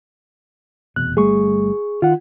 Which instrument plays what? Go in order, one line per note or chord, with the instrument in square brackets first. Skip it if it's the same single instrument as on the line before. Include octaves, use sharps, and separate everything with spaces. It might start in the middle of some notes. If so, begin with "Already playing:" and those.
[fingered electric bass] F1 E2 B2 [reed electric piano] F#6
[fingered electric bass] G1 G3 A3 [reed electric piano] G#4 C#6
[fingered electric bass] D#3 [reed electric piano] F4 F#5